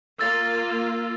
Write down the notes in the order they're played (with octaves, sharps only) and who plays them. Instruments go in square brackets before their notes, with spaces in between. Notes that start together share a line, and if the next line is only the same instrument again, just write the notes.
[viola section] A#3 F4 [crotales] E6 A6